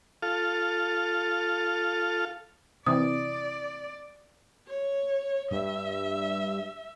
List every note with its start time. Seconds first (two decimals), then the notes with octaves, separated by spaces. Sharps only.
0.23 F4 A4 F5
2.87 C3 E3 D5 D#6
4.67 C#5
5.51 G2 E5